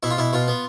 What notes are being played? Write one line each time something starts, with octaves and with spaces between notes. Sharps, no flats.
B2 E4
F4
B2 E4
B2 F4
B3